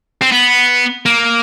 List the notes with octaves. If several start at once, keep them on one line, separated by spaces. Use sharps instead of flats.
C4
B3
A#3